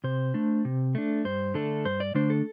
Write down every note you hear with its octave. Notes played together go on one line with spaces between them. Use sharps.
C3 C5
A3 D4
C3
A3 D4
G2 C5
D3 A3 D4 A4
G2 C5
D5
D3 A3 D4 C5
A4